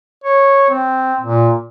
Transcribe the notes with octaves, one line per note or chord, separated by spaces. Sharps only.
C#5
C4
A#2